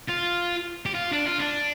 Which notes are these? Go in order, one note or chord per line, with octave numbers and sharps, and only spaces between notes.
F4
G4
F4
D4
F4
D4